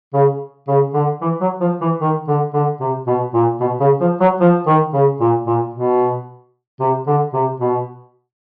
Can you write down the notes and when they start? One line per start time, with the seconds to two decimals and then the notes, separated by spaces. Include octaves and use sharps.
0.14 C#3
0.68 C#3
0.94 D3
1.21 E3
1.41 F#3
1.61 F3
1.81 E3
2.01 D#3
2.28 D3
2.54 D3
2.81 C3
3.07 B2
3.34 A#2
3.61 B2
3.80 C#3
4.01 F3
4.21 F#3
4.41 F3
4.67 D#3
4.94 C#3
5.21 A#2
5.47 A#2
5.74 B2
6.80 C3
7.07 D3
7.34 C3
7.60 B2